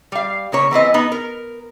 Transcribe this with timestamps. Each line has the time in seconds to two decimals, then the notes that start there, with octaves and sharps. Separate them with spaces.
0.12 G3 F5
0.52 C#3 A#3 C#5
0.71 E3 B3 C4 D#5
0.94 B3 D#4
1.12 A#4